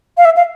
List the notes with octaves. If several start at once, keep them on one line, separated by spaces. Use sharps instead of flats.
F5
E5
F5